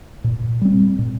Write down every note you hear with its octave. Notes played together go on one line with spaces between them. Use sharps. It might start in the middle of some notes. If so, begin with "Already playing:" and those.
A#2
G3 C4
A#2